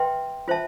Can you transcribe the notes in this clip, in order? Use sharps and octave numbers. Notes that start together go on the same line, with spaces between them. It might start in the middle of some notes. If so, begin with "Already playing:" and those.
Already playing: B4 E5 G5 C6
F4 C5 E5 A5